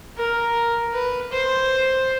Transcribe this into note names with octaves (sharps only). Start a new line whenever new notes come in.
A#4
B4
C5